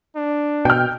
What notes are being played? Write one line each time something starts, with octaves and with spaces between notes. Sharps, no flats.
D4
B2 G5 F6